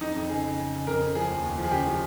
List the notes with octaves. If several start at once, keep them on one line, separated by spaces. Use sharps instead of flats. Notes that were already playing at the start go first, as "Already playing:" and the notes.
F2 D#4
F2
C#3 G#4
C#3
C#3
C#3
F2 A#4
C#3
F3 G#4
D#2
D#2
F3
G#4
C#3 G4
F3